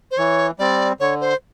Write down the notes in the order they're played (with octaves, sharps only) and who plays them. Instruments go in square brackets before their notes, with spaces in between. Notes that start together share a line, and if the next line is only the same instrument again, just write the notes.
[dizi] C5
[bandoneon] E3 [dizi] C#5
[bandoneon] G3 C4 [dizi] D5
[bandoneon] D3 [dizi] C#5
[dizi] C5